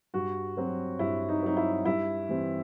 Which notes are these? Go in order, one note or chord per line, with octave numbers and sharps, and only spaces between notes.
G2 F#4
F#3 C4
G2 E4
D#4
F#3 C4 D#4
E4
G2 E4
E3 G3 C4